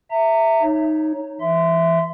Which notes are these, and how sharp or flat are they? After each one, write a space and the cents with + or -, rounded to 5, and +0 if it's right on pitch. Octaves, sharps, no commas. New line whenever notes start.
E5 +0 A#5 -30
D#4 +0 C#5 +0
E3 +25 E5 +0 C6 -25